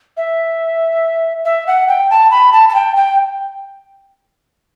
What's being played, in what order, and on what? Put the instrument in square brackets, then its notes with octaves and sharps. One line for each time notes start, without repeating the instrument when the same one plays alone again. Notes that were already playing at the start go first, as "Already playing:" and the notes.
[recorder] E5
E5
F#5
G5
A5
B5
A5
A5
G5
G5